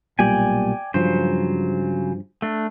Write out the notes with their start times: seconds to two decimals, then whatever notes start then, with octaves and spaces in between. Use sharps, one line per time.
0.19 B1 A#2 G3 D5 G5 G#5
0.94 G2 C#3 F3 F#3 C5
2.42 A3 D4